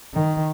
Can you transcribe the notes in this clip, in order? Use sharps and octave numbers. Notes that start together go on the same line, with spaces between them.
D#3